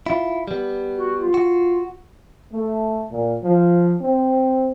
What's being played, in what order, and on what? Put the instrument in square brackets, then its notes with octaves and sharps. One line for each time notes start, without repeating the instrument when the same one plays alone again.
[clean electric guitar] E4 F4
G3 B3
[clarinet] F#4
F4
[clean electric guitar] F#4
[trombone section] A3
A#2
F3
C4